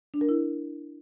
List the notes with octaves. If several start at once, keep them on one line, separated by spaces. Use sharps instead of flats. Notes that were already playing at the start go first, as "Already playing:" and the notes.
D4
A#4
E4